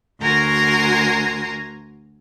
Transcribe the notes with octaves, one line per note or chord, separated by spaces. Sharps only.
D2 F#4 A#4 G#5 A#5 C6